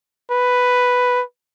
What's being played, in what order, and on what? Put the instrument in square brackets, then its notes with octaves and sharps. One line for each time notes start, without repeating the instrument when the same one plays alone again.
[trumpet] B4